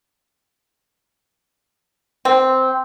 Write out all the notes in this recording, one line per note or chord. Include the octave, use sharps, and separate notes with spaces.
C4